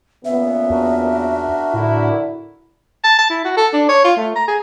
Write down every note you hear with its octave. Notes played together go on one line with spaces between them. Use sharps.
A#2 C#3 B3 E5
E2 D4 F#4 A#4
A2 D3 E4
A5
A5
E4
F#4
A4
D4
C#5
F4
A3
A#5
G#4